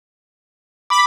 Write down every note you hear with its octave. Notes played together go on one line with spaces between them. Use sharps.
B5 D6